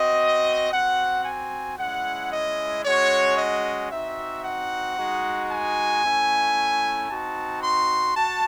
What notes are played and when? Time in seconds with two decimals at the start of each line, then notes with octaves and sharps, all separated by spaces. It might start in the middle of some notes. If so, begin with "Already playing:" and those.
Already playing: C4 F#4 D#5
0.72 C4 F#4 F#5
1.25 G#5
1.78 G#3 C#4 E4 F#5
2.33 D#5
2.85 G#3 C#4 F#4 C#5
3.38 D#5
3.92 C4 D#4 F#4 E5
4.45 F#5
4.97 G#3 D#4 F#4
5.50 G#5
6.04 A3 C#4 E4
7.10 C4 D#4 F#4 A5
7.63 C6
8.16 F#4 A5